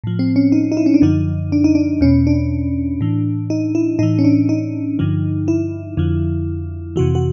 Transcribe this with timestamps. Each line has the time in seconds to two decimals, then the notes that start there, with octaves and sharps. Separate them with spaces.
0.04 A2 F3
0.19 C4
0.36 C#4
0.52 D#4
0.72 D#4
0.77 E4
0.86 C#4
0.94 D4
1.02 F#2 D3 F3 D#4
1.52 D4
1.64 D#4
1.75 D4
2.01 E2 B2 C#4
2.27 D4
3.01 A2 E3
3.50 D#4
3.75 E4
3.99 A2 E3 D#4
4.19 C#4
4.25 D4
4.49 D#4
4.99 G2 D3 F3
5.48 E4
5.97 F2 D3 F3
6.96 F2 C3 E3 F#4
7.15 F#4